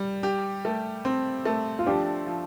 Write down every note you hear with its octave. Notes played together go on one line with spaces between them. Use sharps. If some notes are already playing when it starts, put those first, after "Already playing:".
Already playing: G3
G4
A3
C4
A3
F4
F3 D4 G4
F3